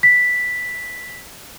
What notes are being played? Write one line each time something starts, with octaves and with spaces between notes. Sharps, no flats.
B6